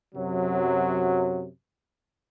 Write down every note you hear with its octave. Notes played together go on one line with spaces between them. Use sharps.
F#2 C3 F#3